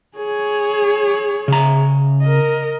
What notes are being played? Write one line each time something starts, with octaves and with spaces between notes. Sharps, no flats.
G#4 C#5
C#3 A#5
A#4 D#5